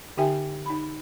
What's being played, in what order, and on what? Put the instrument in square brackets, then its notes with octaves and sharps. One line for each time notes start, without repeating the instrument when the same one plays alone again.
[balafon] D3 D#4 G4 E5 G5 G#5
D#4 B5